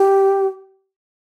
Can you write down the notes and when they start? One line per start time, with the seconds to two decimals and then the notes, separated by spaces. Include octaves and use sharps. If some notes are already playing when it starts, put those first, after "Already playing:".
Already playing: G4